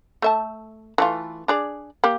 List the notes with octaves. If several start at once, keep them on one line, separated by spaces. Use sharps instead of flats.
A3 E5 A5
E3 A3 F4
D4 G#4 D5
A#3 G4